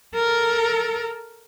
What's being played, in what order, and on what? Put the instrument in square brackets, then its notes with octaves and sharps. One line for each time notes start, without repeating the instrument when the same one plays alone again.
[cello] A4 A#4